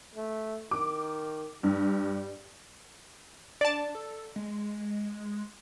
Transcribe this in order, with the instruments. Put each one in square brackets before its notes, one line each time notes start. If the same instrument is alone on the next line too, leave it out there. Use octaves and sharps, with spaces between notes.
[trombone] A3
[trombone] D#3 [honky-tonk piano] D6
[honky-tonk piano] G2 [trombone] G3
[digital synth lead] D4 [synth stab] D5 A5
[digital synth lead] A4
G#3